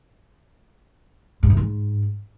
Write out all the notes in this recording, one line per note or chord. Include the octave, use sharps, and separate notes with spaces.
G#2
E3
G#2